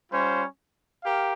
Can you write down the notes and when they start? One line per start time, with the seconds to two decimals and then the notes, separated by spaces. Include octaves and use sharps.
0.11 G3 C#4 F4 C5
1.04 G4 A#4 F5